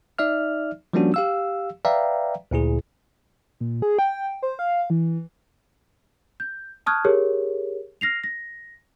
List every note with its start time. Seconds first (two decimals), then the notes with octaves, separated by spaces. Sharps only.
0.19 D#4 D5 E5 F6
0.93 F3 G3 A#3 C#4 D4 F#4
1.14 G4 F5 E6
1.85 B4 D5 E5 F5 G5 A#5
2.51 D2 A#2 E4 G#4
3.61 A#2
3.82 G#4
3.99 G5
4.43 C5
4.59 F5
4.90 E3
6.40 G6
6.86 A5 C#6 D#6 F6 F#6 G#6
7.05 G4 G#4 A#4 C#5
8.01 F6 A#6 C7 F7
8.24 A#6